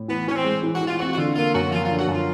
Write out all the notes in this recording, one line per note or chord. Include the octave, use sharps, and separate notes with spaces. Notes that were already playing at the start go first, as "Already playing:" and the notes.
Already playing: A2
E3 B3
E3 C#4
C4
G#3
E3
F#4
E3
F4
C4 F#4
F#4
D3 F4
A#3 F4
F#2 F#4
F3 F4
D3 F4
F#4
F#2 F4